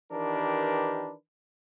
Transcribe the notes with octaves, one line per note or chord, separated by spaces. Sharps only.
D#3 E3 D4 G4 A#4 B4